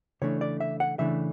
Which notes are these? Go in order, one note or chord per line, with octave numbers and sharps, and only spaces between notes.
C#3 E3 A3 D4 C#5
D5
E5
F#5
C#3 E3 A3 D4 E5